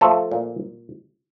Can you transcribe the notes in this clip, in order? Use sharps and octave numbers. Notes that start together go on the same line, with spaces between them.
F3 A3 A4
A#2